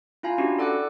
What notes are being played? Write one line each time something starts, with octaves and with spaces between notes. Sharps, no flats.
E4 F4 F5 G#5 A#5
C#4 D4 E4 F#4 G4
A4 D5 F#5 D6 E6 F#6